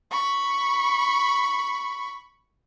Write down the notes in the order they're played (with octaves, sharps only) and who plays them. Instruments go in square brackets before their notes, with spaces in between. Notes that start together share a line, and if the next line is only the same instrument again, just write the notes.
[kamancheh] B5 C#6